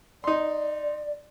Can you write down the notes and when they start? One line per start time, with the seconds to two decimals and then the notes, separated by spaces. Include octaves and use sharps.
0.24 D#4 D5 C6